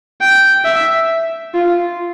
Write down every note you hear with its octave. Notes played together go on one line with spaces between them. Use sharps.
G5
E5
F4